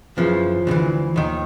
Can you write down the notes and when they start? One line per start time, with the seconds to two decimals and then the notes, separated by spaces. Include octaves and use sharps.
0.17 F#2 C#3 E3 F3
0.67 D2 C#3
0.71 E3
1.16 D#2 D#3